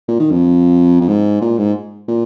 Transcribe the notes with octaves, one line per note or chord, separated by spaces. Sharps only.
A#2
D#3
F2
F2
G#2
A#2
G#2
A#2